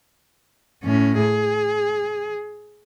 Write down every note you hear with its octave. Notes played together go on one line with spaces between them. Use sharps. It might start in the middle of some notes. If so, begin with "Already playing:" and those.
A2 C#4
G#4